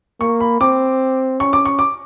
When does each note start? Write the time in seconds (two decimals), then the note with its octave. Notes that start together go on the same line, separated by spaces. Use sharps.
0.21 A#3 C#6
0.40 B5
0.61 C4 D6
1.40 C#4 C#6
1.53 D6
1.65 C#6
1.79 D6